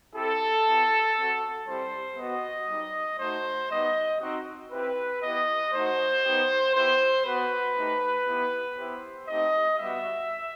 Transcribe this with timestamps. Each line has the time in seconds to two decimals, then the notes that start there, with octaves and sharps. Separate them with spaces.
0.14 C4 E4 G4 A4
0.65 B3 E4 G4
1.16 C4 F#4
1.66 G3 C4 E4 G4 C5
2.17 B3 D#5
2.22 F#4
2.68 G3 D#4 G4
3.19 A3 D#4 F#4 C5
3.70 G3 B3 D#4 G4 D#5
4.21 C4 D#4 F#4
4.72 C4 E4 G4 B4
5.22 B3 E4 G4 D#5
5.73 A3 D#4 F#4 C5
6.24 B3 D#4 G4
6.75 B3 E4 G4 C5
7.25 B3 F#4 B4
7.77 A3 D#4 G4
8.27 B3 E4 G4
8.77 B3 E4 G4 C5
9.28 A3 C4 D#4 G4 D#5
9.79 G3 B3 F#4 E5